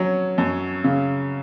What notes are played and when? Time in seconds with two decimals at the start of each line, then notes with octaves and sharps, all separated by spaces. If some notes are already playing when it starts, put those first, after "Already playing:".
Already playing: F#3 C#4
0.38 F#2
0.84 C#3